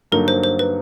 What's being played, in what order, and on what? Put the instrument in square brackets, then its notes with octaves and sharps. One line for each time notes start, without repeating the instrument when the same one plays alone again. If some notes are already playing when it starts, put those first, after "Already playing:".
[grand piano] G2 D3 F#3 A#3 D#4 [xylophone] A#4
[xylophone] C5
C5
B4